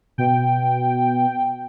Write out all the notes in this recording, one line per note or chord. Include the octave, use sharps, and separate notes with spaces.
B2 G5